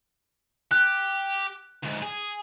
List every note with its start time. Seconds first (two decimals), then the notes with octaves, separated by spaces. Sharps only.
0.71 G4 F#6
1.83 D2 G#2
2.02 G#4